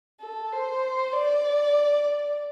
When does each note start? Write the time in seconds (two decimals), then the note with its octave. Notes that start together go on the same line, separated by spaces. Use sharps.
0.20 A4
0.52 C5
1.13 D5